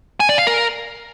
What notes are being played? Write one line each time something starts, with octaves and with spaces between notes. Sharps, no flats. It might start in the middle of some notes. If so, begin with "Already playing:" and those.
G#5
D5
F5
A#4